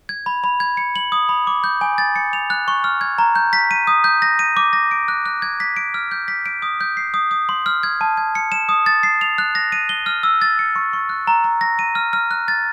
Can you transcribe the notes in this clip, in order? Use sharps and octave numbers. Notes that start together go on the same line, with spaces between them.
G#6
B5
B5
G#6
C#7
F#7
D#6
B5
D6
G6
G#5
A6
C#7
F7
F#6
C#6
F6
G#6
A#5
G6
B6
D#7
D#6
G6
A#6
D#7
D6
A#6
D7
F#6
F#6
G#6
B6
D7
F6
G6
B6
D7
D#6
G6
C7
D#6
D#6
C6
F6
G#6
A5
G#6
C#7
E7
D#6
A6
C7
F7
F#6
A#6
D#7
G7
F6
E6
A6
C#7
C#6
C#6
F#6
A#5
A#5
A#6
D#7
F6
F6
F#6
A6